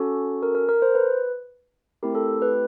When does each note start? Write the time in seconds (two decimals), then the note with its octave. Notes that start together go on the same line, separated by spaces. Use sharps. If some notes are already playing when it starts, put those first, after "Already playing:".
Already playing: C#4 F#4 A4
0.43 A#4
0.55 A#4
0.69 A#4
0.82 C5
0.95 B4
2.03 A3 C4 E4 G4 A#4
2.15 A4
2.42 B4